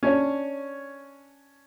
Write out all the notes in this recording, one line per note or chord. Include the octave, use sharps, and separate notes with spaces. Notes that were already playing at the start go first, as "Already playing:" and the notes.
C#4 D4 C#5